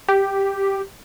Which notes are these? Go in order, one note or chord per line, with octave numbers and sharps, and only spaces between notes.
G4